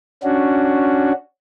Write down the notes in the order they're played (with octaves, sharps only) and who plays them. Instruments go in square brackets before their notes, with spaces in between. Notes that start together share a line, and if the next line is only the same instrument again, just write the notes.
[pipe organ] C#4 D4 F#4